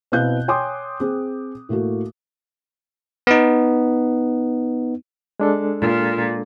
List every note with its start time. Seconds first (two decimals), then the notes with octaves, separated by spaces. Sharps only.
0.12 B2 C4 E4 F5 F#6 G6
0.48 C#5 G5 G#5 C6 D6 D#6
1.00 C4 G#4
1.69 A2 A3 A#3 F#4
3.27 B3 D#4
5.40 G#3 D4 A4
5.80 A#2